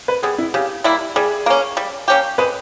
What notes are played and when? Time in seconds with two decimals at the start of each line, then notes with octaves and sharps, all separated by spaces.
0.08 B4
0.23 G3 B3 G#4
0.38 E4
0.54 C#3 G4
0.84 G3 A#3 E4
1.16 G3 G#4
1.46 A#3 C#4
1.77 G3
2.08 A#3 C#4 G4
2.38 G#3 B4